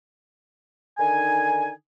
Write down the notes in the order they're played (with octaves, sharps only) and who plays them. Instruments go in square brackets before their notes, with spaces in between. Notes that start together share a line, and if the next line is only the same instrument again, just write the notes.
[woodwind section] D3 D#3 D#4 G#5